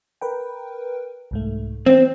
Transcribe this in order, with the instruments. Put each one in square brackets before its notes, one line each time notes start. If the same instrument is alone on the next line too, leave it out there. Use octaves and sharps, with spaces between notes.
[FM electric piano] A#4 B4 G5
C2 G#2 A3
[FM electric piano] E3 [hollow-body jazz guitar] C4 [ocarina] C5